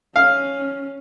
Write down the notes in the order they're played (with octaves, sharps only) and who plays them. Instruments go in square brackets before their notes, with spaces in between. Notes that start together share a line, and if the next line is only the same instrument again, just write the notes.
[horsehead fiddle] C#4 [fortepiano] F5